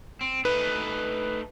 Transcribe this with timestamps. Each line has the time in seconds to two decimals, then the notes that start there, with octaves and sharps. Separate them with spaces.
0.21 C4
0.45 A3 D#4 B4